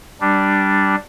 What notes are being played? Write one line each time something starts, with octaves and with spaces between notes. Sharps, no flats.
G3 D4